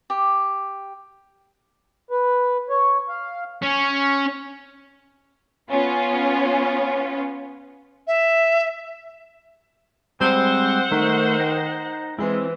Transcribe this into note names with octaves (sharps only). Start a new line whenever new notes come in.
G4
B4
C#5
F5
C#4
B3 C#4 F4
E5
G3 G#3 C4 C5 F#5
D#3 A3
D#4 D#5 G5
E3 G#3 C4 E4